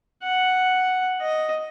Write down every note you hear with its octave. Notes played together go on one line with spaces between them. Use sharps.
F#5
D#5